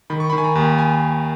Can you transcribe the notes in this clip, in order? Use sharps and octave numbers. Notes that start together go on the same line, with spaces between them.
D#3 B5
C#6
D#3 B5
G#5
A#5
D#2
G#5